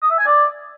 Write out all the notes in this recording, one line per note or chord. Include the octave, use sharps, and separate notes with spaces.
D#6
E5
G#5
D5